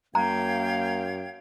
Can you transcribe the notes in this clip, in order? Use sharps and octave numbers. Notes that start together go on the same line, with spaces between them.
F#2 A#3 F5 G5 A#5 G#6